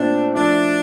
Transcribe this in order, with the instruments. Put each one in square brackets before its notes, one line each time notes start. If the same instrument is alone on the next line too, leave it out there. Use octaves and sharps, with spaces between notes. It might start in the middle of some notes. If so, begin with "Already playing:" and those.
Already playing: [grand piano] A#2 A3 C4 [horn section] D4
[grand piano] F3 A3 E4 [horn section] D4